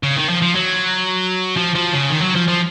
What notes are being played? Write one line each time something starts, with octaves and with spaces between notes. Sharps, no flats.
C#3
D#3
F3
F3
F#3
F3
F3
C#3
D#3
F#3
F3
F3